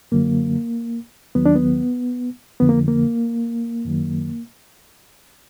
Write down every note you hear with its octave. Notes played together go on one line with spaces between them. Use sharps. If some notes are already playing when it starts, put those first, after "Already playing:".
F#2 D3 F#3 A#3
D#2 D#3 F#3 B3
D4
B3
F2 D3 F3 B3
A#3
A#3
F#2 D#3 F#3